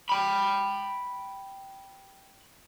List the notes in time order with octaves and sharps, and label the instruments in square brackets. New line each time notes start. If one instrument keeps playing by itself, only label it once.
[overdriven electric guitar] G5 B5